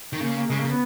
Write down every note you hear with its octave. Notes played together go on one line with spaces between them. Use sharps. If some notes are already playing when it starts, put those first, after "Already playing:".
D#3
C#3 A#3
A#3
C#3 G#3
A#3
C#3
B3